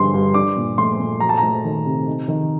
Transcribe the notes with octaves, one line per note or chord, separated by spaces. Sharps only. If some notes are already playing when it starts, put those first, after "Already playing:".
Already playing: G2 D3 G3 C6
G2
D4 D6
A#2
A3 C6
A#2
F#3 A#5
A5
A#5
A3
D#3
C3
D#4
D#3